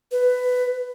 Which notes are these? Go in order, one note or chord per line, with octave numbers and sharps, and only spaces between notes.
B4